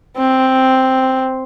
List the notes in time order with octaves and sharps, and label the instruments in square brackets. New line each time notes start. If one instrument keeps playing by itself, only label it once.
[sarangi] C4